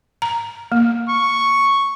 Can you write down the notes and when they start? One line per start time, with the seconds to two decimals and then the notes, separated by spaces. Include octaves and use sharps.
0.22 A#5
0.72 A#3
1.09 C#6